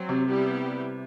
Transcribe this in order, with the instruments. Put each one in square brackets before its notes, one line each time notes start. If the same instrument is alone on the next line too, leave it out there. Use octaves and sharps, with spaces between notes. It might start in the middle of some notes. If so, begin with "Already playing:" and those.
Already playing: [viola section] F#3 C4
[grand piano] C3
[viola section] G3 B3 E4 G4